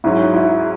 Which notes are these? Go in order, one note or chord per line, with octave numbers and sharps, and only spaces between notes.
G#2 F#3 C#4 E4
E4